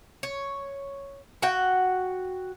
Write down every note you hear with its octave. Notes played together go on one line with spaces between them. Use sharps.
C#5
F#4 F#5 G5